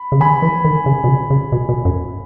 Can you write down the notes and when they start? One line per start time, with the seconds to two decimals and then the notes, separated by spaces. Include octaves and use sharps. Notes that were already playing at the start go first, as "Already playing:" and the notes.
Already playing: B5
0.12 C#3
0.20 D#3 G#5 B5
0.42 E3
0.65 D#3
0.86 C#3
1.04 B2
1.08 C#3
1.30 C#3
1.52 B2
1.69 B2
1.85 F#2